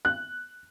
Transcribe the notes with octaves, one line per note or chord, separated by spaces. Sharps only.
F#6